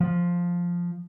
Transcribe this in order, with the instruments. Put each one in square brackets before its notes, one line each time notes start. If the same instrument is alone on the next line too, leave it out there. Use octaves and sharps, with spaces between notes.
[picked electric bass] F3